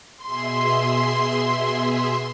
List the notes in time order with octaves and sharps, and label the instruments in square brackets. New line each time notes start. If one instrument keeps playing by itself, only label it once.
[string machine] B2 G#4 E5 [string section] C6